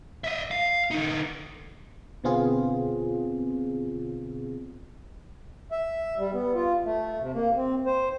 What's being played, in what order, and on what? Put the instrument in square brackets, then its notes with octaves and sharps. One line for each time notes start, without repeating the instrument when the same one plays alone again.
[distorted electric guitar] D#5 E5
F5
D3 D#4
[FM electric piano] B2 D3 B3 C4 F4 G#4
[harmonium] E5
G3
B3
F4
A3
C3
A#3
C4
C5